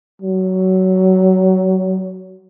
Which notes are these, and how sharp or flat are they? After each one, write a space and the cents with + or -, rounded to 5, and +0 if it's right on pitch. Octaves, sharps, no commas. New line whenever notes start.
F#3 +20